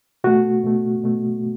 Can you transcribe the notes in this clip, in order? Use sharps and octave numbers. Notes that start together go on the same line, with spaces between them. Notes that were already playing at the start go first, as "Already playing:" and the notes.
B2 A3 F#4
B2 A3
B2 A3